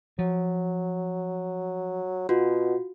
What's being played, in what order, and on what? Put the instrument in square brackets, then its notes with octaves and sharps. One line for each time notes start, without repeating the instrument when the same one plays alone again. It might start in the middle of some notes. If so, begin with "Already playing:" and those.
[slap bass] F3 [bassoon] F#3
[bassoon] B2 [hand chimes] F4 F#4